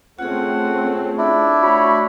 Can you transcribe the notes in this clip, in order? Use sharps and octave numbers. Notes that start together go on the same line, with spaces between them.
A3 C4 C#4 F4 G#4 F#5
D4 E4
A3 F#4 C#5 B5